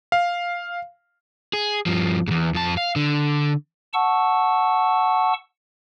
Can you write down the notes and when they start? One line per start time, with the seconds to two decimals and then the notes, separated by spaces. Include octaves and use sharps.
0.12 F5
1.53 G#4
1.86 G2 F3
2.28 E2 G#2
2.54 F2 A5
2.77 F5
2.96 D3
3.94 F#5 A5 C#6 E6